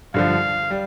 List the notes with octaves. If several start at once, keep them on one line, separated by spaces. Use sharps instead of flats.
G2 D3 F3 F5
G3